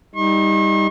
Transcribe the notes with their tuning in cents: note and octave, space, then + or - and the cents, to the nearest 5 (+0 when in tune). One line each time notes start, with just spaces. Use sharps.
G3 +20 D#4 +20 C#6 -45